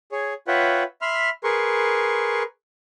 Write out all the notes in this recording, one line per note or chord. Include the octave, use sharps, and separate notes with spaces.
G#4 C#5
F4 B4 C#5 E5 F#5 G5
E5 B5 C6 F6
G#4 A#4 B4 C6 C#6